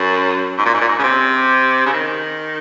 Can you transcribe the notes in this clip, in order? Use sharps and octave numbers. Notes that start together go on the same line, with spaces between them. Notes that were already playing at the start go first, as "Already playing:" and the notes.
Already playing: F#2
G#2
A#2
G#2
A#2
G#2
C#3
C3
C#3
D#3